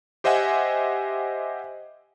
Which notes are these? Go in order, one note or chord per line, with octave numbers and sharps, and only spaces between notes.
G4 C5 D#5 E5 F#5 G#5